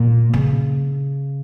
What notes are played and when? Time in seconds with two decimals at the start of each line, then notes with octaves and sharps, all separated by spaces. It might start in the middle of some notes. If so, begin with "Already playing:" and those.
Already playing: A#2
0.33 C#3